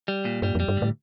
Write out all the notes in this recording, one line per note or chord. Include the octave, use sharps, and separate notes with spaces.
G3
A#2
G2 G3
F2
G3
G2
D2 A2